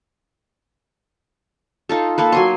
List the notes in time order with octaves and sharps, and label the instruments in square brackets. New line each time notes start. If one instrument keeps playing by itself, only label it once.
[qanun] D#4 F4 A4
A#3 A4 B4
F#3 G#5 C6